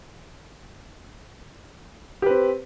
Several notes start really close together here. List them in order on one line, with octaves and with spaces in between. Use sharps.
G4 B4 C4